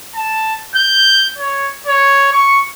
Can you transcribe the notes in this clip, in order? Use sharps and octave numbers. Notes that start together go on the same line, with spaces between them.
A5
G6
C#5
C#5
C#6